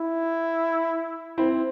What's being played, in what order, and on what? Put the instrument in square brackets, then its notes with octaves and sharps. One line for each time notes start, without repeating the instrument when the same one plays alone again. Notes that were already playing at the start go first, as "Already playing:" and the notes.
Already playing: [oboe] E4
[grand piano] C4 E4